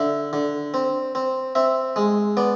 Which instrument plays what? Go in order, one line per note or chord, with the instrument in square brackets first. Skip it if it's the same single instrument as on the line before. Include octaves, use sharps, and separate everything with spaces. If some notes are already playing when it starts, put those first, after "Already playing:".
Already playing: [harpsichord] D3 E5
D3
C4
C4
C4 E5
G#3
B3 D5